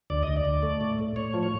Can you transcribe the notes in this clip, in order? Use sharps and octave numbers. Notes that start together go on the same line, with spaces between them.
D2 D5
D2 D#5
D5
D2
A3
A2
A2
A2 C#5
F3
C#5